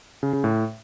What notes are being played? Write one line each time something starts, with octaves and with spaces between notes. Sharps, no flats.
C#3
C#3
A2